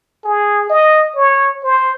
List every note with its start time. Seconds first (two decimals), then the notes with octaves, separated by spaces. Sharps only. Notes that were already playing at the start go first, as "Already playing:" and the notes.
0.24 G#4
0.70 D#5
1.16 C#5
1.64 C5